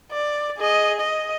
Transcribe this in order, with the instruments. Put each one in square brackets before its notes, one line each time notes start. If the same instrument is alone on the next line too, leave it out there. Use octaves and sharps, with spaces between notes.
[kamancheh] D5
G#4 D#5
D#5